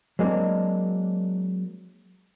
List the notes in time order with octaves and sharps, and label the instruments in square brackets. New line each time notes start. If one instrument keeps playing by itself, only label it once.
[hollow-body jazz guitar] F#3 G#3 A#3 C4 D4